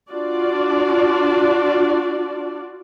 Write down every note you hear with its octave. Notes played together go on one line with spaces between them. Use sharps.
D4 F4 F#4 D5